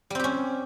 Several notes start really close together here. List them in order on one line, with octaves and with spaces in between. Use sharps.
G3 C4 G4 C#4